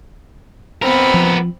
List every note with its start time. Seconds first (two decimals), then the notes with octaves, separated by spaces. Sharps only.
0.82 B3 C4 A#4 B5
1.14 F3